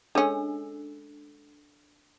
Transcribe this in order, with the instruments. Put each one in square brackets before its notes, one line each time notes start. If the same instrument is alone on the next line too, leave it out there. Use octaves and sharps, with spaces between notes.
[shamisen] G#3 C#4 [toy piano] D4 A4 E6